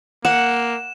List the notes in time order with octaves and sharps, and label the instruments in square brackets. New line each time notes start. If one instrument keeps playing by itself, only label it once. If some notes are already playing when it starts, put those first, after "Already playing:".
[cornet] A#3 [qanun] F#5 [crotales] E7